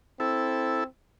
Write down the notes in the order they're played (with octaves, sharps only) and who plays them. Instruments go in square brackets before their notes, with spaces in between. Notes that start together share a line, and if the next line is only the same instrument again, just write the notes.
[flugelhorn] C4 [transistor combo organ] E4 A4